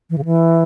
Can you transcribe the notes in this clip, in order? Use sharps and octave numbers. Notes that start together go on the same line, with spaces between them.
E3
C#3
E3